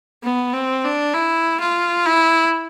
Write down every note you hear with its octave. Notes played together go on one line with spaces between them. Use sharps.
B3
C4
D4
E4
F4
E4